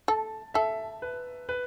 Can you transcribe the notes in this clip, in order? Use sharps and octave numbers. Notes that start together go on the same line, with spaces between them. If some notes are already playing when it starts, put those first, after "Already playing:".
A4 A5
A4 E5
B4
B4